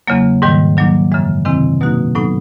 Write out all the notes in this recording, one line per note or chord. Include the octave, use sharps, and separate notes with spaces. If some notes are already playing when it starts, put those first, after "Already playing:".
E2 C#3 F#3 A#3
G#2 D#3 G3
D#3 F#3 A#3 D4
F#2 C#3 E3 G#3
C3 D#3 G#3 C4 E4
B2 F#3 A#3 D#4 F#4
A2 F#3 B3 D#4